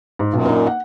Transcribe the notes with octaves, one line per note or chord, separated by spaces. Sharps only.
G#2
B1 F#2 A#2
A#3 D#4
F#5